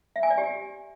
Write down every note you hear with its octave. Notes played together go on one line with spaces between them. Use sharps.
E5
G#5
D5
G4